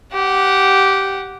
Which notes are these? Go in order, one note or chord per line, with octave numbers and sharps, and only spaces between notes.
G4 F#5